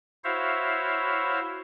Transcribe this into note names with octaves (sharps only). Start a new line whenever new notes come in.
E4 F#4 C5 C#5 E5 F5